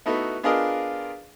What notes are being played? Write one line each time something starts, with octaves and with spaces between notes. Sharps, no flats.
A3 B3 D#4 E4 F#4
B3 D4 F4 G#4 A#4 D#5